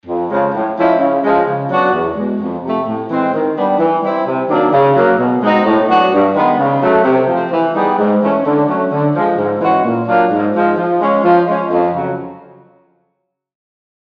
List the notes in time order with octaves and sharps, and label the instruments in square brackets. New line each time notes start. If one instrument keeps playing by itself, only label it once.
[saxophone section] F2
C#3 F3 G#3 C#4
A2
F3 G#3 C#4 E4
C#3
F3 G#3
C#3
F#3 B3 D4 F#4
E2
B2 G#3
F2
C3 F3 A3
A2
E3 G#3 C4
D#3
G3 B3 D4
E3
G3 C4 E4
C3
D#3 F#3 A#3 D4
C#3
F#3 A#3
B2
G#3 C4 D#4 F#4
A2
F#3 B3 D4 F#4
G2
D#3 G#3 B3
C#3
F#3 A3
C3
F3 A3 C4
E3
G3 B3 D#4 G#4
G#2
E3 A3 C#4
D3
F#3 A3 C#4
D3
F3 G#3
G#2
E3 G#3 C#4 F#4
A#2
F#3 A#3 D4 F4
G#2
F3 G#3
F3
G#3 C#4
F3
G#3 C#4
F2
C#3 F#3